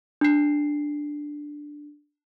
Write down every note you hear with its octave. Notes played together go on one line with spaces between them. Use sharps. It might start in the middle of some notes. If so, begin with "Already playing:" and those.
D4 C7